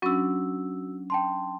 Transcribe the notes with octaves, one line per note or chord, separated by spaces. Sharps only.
F#3 C#4 D4 F#4 E6
G5 A5 C6